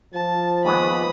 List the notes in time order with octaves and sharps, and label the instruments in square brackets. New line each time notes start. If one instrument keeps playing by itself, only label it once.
[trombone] F3 [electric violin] A5
[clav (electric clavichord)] D#2 G#3 B3 [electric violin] B5 D#6